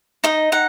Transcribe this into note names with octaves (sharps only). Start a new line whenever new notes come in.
D#4 D#5
D#4 F#5